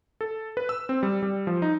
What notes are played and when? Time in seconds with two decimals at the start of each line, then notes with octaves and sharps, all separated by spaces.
0.21 A4
0.57 B4
0.69 E6
0.89 C4
1.03 G3
1.23 G3
1.47 F3
1.62 D#4